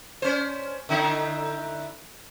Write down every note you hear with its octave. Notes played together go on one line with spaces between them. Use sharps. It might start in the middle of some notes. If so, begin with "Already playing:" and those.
C#4 C5
D3 D#4 E4